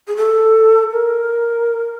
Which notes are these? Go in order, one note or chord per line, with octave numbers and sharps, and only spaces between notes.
G#4
A4
A#4